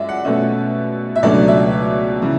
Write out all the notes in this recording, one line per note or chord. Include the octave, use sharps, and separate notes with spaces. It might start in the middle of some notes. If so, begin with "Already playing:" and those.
Already playing: F#2 G#3 D5 E5
F#5
B2 A3 C#4 E5
E5
C#2 B2 F#3 A3 D4 D5
E5
C#3 E3